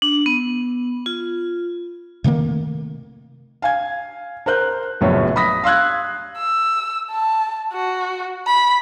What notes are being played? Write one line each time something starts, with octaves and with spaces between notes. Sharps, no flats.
D4
B3
F4
C3 D#3 A3 A#3
F5 G#5 G#6
A#4 C5 F#6 G6
A#1 F#2 A2 C#3 B3 C#5
B5 D#6 A#6 B6
F5 C6 E6 F#6 G#6
E6
A5
F#4
B5